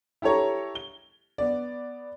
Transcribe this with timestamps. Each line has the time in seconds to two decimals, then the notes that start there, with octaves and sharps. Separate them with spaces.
0.22 E4 G4 A4 C#5 A#5
0.75 G7
1.38 B3 D5